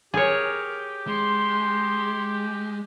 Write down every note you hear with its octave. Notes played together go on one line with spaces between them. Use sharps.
G4 G#4 A#4 C#5
G#3 C6